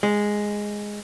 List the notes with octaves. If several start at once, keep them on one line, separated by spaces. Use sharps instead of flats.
G#3